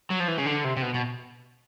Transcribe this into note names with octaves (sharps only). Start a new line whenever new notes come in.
F#3
F3
E3
C#3
D3
C3
C3
B2
B2